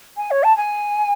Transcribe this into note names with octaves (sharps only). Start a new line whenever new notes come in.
G#5
C#5
A5
G#5